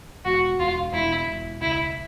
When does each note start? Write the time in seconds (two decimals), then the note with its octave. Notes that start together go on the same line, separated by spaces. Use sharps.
0.25 E1 F#4
0.59 E1 F4
0.93 E1 E4
1.28 E1
1.62 C#2 E4